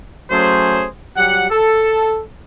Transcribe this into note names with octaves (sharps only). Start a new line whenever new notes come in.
F#3 A3 C#4 G#4 C5
F#3 G3 G4 F#5
A4